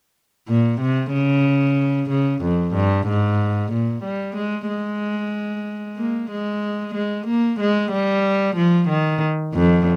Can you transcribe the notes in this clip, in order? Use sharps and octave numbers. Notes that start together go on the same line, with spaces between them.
A#2
C3
C#3
C#3
F2
G2
G#2
A#2
G3
G#3
G#3
A#3
G#3
G#3
A#3
G#3
G3
F3
D#3
F2